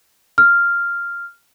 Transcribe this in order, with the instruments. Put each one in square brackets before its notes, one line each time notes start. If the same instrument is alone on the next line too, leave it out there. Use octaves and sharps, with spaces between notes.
[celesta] F6